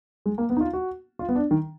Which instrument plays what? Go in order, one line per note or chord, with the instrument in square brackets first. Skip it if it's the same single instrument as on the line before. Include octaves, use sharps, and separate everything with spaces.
[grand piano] G#3
A#3
B3
D#4
F4
F#4
F4
B3
D4
D#3